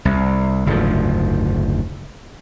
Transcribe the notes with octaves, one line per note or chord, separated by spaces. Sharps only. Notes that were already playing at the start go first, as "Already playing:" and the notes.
C2
F#1 D2 G#2 F3